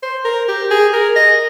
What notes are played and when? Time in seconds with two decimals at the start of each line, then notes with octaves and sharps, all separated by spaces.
0.03 C5
0.25 A#4
0.48 G4
0.71 G#4
0.93 A#4
1.16 D#5